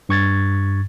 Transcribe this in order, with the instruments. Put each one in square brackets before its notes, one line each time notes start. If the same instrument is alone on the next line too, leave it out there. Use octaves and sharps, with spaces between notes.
[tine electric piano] G2 C#6 G#6 A6